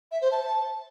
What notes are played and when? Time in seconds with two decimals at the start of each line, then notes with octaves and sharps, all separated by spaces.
0.11 E5
0.21 C5
0.32 A5